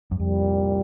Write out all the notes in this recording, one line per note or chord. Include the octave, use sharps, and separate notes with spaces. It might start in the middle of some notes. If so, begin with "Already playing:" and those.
F#2
C2 F2 A#2 G3